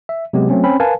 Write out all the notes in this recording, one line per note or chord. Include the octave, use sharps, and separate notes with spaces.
E5
C3 F#3 G#3 B3 G4
F#3 A3 C4 C#4
C4 C#4 B5
A#4 B4 F5 G#5 A5